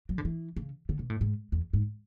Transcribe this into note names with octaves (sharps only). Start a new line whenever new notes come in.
F#3
D3
E3
C#3
D3
B2
A2
G#2
E2
G#2